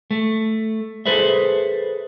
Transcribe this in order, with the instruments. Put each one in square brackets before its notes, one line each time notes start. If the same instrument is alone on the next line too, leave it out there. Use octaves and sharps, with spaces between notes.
[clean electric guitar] A3
G#4 A4 B4 C5 E5